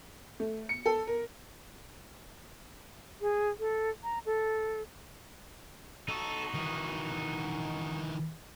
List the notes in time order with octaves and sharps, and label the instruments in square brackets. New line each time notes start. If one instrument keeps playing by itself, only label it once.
[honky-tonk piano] A3
C#7
A4
A#4
[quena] G#4
A4
A#5
A4
[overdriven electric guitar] D#4 F#4 [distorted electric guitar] A4
[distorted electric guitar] D#3 E3